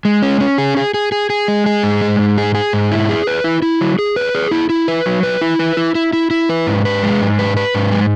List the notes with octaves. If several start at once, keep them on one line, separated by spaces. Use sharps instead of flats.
G#3
C#4
C#4
G#4
G#4
G#4
G#4
G#4
G#3
G#4
G#2
G#3
G#2
G#4
G#4
G#2
E4
G#4
B4
E4
E4
F#3
G#4
B4
G#4
E4
E4
B4
F#3
B4
E4
B4
E4
E4
E4
E4
B4
G#2
B4
G#3
G#2
B4
B4
G#2
G#3